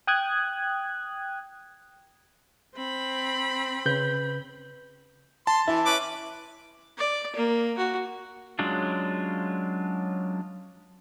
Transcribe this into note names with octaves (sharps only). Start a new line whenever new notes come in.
G5 D#6 F#6 G#6
C4 B5
C#3 B4 G6
A5 C6
E3 E4
C#4 B4 D6
D5
A#3
F#4
F#3 G#3 C#4 D4 F4